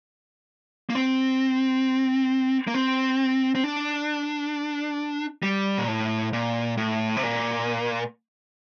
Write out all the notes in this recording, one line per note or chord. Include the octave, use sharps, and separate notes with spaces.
A#3
C4
A#3
C4
C4
D4
G3
A#2
A2
A#2
A2
C3
A#2